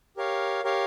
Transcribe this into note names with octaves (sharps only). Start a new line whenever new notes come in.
G4 A#4 C#5 F5
G4 A#4 C#5 F5